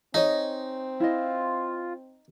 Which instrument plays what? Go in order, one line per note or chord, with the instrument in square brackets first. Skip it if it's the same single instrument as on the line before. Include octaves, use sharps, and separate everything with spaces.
[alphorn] C4 [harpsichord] D#4 [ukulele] G#4 C#5 D#5
[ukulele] E4 D#5 [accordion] F4